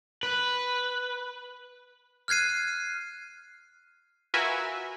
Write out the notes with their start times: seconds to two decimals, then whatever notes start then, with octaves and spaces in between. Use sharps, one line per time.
0.23 B4
2.28 F6 F#6 G#6 C7 D#7
4.34 F4 F#4 A#4 B4 E5 G#5